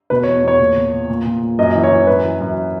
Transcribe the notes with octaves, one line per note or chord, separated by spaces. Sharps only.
B2 B4
C#5
E2
E2 C#5
A#2
A#2
A#2
A#2
A#2
A#2
F#2 D#5
E3
C#5
E3
F#2 B4
E3
F#2